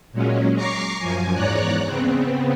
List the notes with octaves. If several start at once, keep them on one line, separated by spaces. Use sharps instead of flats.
A#2 F#3 G#3 C#4
A#5 C#6 D6 A#6 C7
F#2 F3 G#5
E2 G#2 C#5 D5 A#5 F#6
C#3 B3 C4